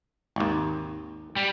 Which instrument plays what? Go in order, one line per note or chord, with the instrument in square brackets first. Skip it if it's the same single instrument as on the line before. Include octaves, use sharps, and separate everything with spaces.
[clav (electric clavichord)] G#1 D#2
[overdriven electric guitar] G3